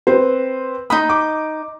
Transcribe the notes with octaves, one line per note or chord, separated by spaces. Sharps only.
C4 B4 C5
D#4 D#5 B5 D#6
D6